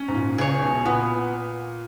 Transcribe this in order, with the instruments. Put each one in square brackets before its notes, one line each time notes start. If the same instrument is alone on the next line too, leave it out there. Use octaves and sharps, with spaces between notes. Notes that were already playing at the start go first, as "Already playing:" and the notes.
Already playing: [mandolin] C#4
[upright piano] G#2
A#2
[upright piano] C#2 C#3 [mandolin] G#4 C#5
[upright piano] B1 B2
[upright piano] A#2 [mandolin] B3